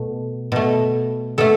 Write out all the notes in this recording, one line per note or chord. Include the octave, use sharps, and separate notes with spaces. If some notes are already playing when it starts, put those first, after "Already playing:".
Already playing: B2 A3
B2 A3
B2 A3 A4